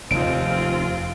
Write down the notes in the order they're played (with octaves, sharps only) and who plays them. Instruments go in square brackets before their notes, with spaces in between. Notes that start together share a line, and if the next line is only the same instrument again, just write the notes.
[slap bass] F1 D#2 F3 [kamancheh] C4 F4 [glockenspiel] D7